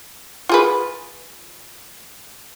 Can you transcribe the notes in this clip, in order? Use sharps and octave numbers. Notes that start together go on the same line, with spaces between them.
F4 G#4 B4